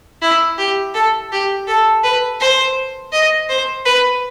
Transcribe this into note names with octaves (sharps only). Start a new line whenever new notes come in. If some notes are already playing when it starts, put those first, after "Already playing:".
E4
G4
A4
G4
A4
B4
C5
D#5
C5
B4